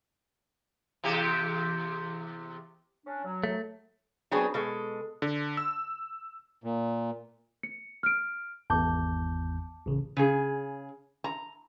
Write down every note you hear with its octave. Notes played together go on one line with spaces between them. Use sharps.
E2 C3 G4
C#4 D4
F#3
A3
F#3 B3 C4 D4 G#4
B2 G#3 A4
D3
E6
A#2
C#7
F6 D7
G#1 E2 A5 D6 G6
A1 C#3
C#3 G#4
A#5